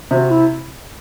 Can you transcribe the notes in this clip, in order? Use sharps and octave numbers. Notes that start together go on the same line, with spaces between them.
C3 F#4
E4